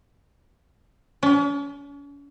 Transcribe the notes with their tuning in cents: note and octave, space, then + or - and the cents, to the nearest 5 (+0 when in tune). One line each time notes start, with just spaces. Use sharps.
C#4 +40